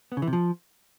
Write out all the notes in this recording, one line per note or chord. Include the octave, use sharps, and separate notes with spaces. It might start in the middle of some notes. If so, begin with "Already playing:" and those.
B3
C#3
E3
C3
F3